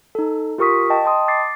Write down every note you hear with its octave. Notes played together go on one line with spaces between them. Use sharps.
D#4 A4
F4 G4 A#4 C#6 D#6 B6
D#5 G5 A5
D#5 G5 A5 C6 D#6
D6 A6 C7